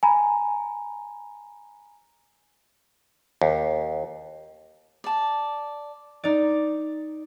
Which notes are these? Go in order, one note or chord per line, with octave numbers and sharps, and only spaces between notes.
G#5 A#5 B5
D#2
D5 A5
D#4 D5